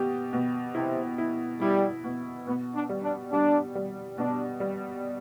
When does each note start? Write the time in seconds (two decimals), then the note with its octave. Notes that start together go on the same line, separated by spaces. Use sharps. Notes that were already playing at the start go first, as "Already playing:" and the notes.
Already playing: B2 G4
0.33 B2
0.75 C3 E4
1.18 E4
1.61 G3 E4
2.04 B2
2.47 B2 B3
2.75 D4
2.89 G3
3.03 D4
3.32 G3 D4
3.75 G3
4.18 B2 D4
4.60 G3